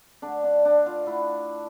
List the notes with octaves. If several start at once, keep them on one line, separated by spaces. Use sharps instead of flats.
D3 A3 D4
D4
D4
F4
D3 A3 E4